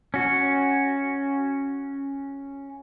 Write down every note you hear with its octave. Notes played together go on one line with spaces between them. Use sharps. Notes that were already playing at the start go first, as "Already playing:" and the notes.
C#4 F#4